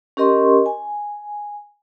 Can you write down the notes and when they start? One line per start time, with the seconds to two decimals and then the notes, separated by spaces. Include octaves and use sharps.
0.17 C#4 G4 A#4 D#5 C6 C#6
0.66 G#5